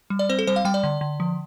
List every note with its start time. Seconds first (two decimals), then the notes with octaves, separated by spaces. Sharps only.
0.10 G3
0.19 D5
0.29 C4 C5
0.39 A4
0.47 G3 C5
0.56 F5
0.65 G3 G5
0.74 D5
0.84 D3
1.01 D3
1.20 F3